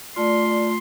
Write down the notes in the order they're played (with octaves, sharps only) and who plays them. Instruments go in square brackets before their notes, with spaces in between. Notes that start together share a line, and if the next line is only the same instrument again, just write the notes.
[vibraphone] A3 F4 [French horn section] D5 [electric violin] C6